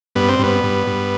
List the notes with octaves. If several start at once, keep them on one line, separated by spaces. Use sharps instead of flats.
G2 B3
C4
G2 B3
G2
G2